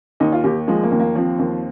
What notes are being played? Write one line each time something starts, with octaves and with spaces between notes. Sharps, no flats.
D#2 D#4
F4
D#2 G4
F3 G#3
A#3
D#2
A#3
F3 C4
D#2